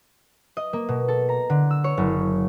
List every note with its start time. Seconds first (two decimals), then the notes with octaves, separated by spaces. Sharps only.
0.57 D#5
0.73 A#3
0.89 B2
1.08 A4
1.29 A#5
1.50 D3
1.71 E6
1.84 C#5
1.97 F#1